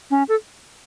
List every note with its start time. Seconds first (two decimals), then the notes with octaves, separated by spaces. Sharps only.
0.11 C#4
0.29 A4